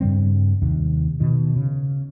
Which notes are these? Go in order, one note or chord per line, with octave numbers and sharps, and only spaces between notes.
G2 C#3 G3 C4
D#2 C3
B2 D#3
C#3